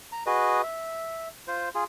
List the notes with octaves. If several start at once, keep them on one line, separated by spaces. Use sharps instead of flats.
A#5
F#4 G#4 B4 D#5
E5
F4 C5
F4 G#4